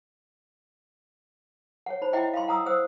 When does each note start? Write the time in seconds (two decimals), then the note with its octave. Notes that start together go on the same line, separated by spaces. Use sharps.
1.86 C#5 F#5
2.02 D#4 C5 B5
2.13 E4 D#5 E5 F#5 G5 B5
2.33 F5 B5 C6
2.48 F#5 A#5 D#6 E6
2.66 C5 F#5 D#6 E6